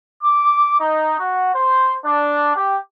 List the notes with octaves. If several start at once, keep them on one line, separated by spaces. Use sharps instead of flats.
D6
D#4
F#4
C5
D4
G4